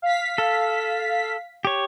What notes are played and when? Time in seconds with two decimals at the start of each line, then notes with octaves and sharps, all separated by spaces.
0.02 F5 B6
0.38 A4
1.65 G4 C#5